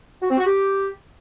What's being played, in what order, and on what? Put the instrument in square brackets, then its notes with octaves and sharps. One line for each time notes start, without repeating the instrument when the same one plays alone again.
[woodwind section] F#4
C4
F#4
G4